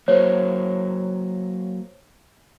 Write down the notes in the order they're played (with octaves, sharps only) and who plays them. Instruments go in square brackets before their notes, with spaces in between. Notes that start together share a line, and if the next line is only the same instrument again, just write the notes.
[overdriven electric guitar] F#3 A#3 [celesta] C5 C#5